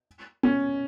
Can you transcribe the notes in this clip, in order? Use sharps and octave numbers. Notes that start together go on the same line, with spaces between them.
C#4